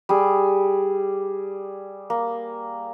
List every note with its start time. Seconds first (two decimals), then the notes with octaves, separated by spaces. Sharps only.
0.09 G3 G#4
2.10 A#3